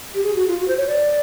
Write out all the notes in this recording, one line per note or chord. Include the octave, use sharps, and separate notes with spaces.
G4
G#4
F#4
F4
F#4
C5
C#5
D5